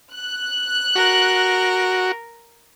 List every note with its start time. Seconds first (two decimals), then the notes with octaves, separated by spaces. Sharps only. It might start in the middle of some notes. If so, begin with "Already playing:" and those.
0.14 F#6
0.95 F#4 A#4